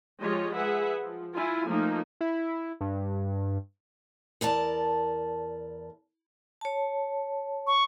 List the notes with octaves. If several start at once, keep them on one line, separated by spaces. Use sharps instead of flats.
F3 G#3 F4 G4 C#5 D#5
G#4 B4 E5 F#5
F3
E4 F4 G#5
F3 A3 A#3 D#4
E4
G2
E2 A#4 D5 A5
C#5 A5
C#6